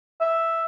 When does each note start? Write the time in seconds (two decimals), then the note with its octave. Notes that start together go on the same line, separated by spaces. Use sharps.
0.21 E5